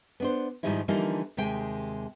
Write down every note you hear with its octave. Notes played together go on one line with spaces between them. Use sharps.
B3 D4 C5
G#2 D#3 F3 G3 D#4 E4
D3 E3 F3 G3 A#3 D#4
D#2 C3 G#3 G5